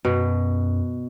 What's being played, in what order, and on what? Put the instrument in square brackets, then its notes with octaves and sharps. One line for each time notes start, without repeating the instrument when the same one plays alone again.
[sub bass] F#2 [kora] B2